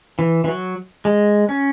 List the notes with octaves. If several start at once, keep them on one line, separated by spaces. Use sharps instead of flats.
E3
E3
F#3
G#3
C#4